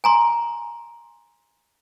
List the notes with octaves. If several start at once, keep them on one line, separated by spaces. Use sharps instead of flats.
G#5 A#5 C6